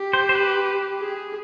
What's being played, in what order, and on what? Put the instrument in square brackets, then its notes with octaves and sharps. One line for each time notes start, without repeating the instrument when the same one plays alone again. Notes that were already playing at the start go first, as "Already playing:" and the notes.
Already playing: [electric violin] G4
[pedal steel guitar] C5
C5
B4
[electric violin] G#4